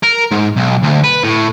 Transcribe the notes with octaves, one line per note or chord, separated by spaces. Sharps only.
A#4
G#2
B1
D2
B4
A2